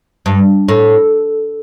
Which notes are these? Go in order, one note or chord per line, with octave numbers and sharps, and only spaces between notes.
G2
A2